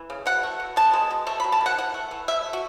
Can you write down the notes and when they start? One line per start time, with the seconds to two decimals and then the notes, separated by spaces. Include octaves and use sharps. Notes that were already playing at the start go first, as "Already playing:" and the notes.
Already playing: E3
0.10 C#3
0.26 B2 F#5
0.43 A3
0.60 B2
0.76 B3 A5
0.93 G#3
1.11 B2
1.27 A3 A5
1.40 B5
1.44 F#3
1.52 A5
1.61 D#3
1.66 F#5
1.78 E3 F#5
1.94 A3
2.11 E3
2.28 E3 E5
2.46 A3
2.53 F#4